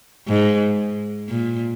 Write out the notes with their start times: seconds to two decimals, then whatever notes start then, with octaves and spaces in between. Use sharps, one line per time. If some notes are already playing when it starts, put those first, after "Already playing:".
0.28 G#2
1.29 A#2